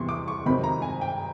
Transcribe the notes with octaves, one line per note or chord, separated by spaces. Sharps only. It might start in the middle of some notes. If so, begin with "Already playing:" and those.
Already playing: E2 C3 E3 G3 C6 C#6
D6
C#6
F2 C3 D#3 F#3 B5
A#5
G#5
G5